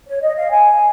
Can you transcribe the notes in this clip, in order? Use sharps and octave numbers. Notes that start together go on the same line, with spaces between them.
C#5
D#5
F5
G#5